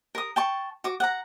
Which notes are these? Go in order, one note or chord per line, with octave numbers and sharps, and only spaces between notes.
A#4 D#6
G5 A5 C#6
F#4 D6
F#5 A#5